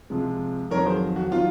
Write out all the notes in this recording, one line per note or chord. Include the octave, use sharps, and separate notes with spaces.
C3 F3 G#3
F2 D#3 F#3 A#4 C#5
G#4 C5
F#4
D#3 F#3 F4